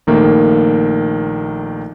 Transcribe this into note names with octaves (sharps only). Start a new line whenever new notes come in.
A#1 D#3 A3 A#3